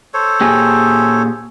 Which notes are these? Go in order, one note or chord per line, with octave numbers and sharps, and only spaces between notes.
A4 C5 C#5
A#2 G4 G#4